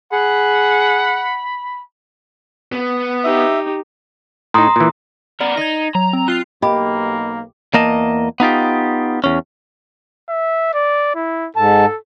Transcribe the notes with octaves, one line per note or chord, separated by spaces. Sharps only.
G#4 F#5 B5
B3
D#4 G4 E5
A2 D#4 A#5 C6 D#6
A#2 E3
B3 A#4 D5
D#4 G#6 A#6
F#3 A#5
C4
F4 F#6 C7 F7
B1 A#3 G4 D#5 B5
E2 A#3 D#5 A5
B3 D#4 F4 G4
E2 C#4
E5
D5
E4
G#2 A4 A5